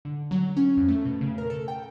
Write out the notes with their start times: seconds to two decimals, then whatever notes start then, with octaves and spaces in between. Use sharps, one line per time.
0.05 D3
0.31 F#3
0.57 C#4
0.77 F2
0.88 A3
1.05 B2
1.21 C#3
1.38 A#4
1.50 A4
1.68 G5